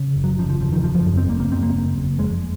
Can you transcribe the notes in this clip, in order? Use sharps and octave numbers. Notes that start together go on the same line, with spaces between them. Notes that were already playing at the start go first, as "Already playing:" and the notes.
Already playing: C#3
F#1
F#3
C#3 F3
F3
F#1 F3
D#3
F#1 F3
F3
F#2
C4
F#1 A#3
A#3
F#1 C4
A#3
F#1
F#1
F2 G#3